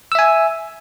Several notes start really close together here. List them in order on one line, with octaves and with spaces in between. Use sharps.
E6 E5 G#5